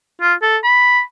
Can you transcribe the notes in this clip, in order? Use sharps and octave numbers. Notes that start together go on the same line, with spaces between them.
F4
A4
B5